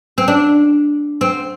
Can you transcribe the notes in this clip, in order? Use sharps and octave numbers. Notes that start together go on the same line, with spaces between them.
C4
D4
C4